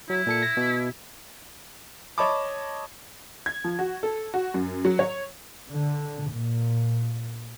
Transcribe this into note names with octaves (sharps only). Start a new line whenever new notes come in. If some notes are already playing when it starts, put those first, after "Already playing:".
F#3 E4
A#2 A4 C#7
A#6
B2
C#5 D#5 A5 B5 D6
G#6
F3
F#4
A4
F#4
F#2
F#3
C#5
D3
A#2